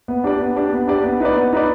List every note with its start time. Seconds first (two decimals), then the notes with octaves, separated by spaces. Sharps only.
0.08 B3
0.24 D4 G4 D5
0.40 B3
0.56 D4 G4 D5
0.72 B3
0.87 D4 G4 D5
1.04 B3
1.20 D#4 B4 D5
1.35 B3
1.53 D#4 B4 D5